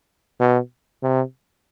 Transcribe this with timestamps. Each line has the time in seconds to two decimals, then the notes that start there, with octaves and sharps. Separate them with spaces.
0.40 B2
1.03 C3